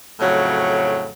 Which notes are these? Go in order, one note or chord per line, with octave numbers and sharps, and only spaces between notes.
F2 A2 C#3 F#3